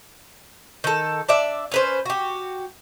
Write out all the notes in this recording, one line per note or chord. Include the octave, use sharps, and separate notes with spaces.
D#3 A4
D4 D5 E5
C#4 B4 C5
F#4 G4